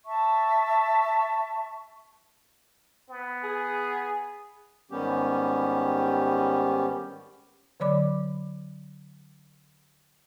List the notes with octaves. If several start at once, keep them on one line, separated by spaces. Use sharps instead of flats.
E5 A5 C#6
B3
G#4
G#2 D#3 G3 B3 C#4 G4
D3 F#3 C#5 D5 B5 D6